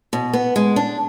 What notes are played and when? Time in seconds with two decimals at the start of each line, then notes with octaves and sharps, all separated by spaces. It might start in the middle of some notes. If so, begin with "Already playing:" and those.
0.13 B2
0.33 B3
0.56 G#3
0.76 D4